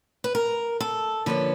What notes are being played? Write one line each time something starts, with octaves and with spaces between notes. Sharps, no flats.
B4
A#4
A4
D3 F3 A#3 C#4 B4